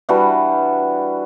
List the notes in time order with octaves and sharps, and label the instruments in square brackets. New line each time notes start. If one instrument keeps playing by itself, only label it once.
[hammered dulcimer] E3 G3 D4 F#4